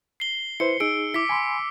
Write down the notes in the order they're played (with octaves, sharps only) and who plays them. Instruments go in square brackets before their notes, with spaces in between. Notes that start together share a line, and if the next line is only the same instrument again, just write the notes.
[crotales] C7 G7
[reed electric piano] E4 B4 C5 [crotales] C#7
[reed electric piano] D#4 G#4 [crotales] E6 D7
[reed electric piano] E4 [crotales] D6 B6
[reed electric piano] G#5 B5 C6